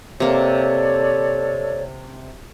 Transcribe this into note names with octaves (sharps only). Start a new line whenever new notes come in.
C3 A#3 A4 C#5 D5